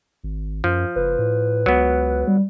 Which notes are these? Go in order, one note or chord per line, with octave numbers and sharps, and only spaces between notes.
G#1
F#2 F3
F#1 B4
A2
C#2 F#3 B3
G3